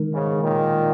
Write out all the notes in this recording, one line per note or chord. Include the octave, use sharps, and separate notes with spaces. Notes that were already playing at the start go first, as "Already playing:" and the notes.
Already playing: D#3 G#3 D#4 A#4
G#2 C#3
A#2 D#3